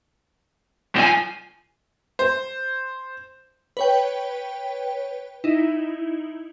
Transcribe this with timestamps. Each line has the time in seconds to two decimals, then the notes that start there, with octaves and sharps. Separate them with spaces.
0.95 B1 F3 G#5
2.19 C5
3.77 B4 C#5 G5
5.44 D#4 E4